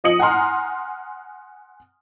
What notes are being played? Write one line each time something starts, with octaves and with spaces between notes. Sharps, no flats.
F3 D#5 D#6 C#7 F#7
F#5 G#5 A#5 C6 F6